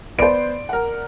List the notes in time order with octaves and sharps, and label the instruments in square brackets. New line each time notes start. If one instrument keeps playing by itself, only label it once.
[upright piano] B3 C5 [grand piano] D5 D7
[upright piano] A#4 F#5